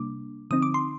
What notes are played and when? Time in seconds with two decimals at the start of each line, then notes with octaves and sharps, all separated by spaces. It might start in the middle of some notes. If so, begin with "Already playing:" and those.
Already playing: C3 G3 A#3 D4 D6
0.51 D3 F3 C4 D#4 D#6
0.62 D6
0.74 C6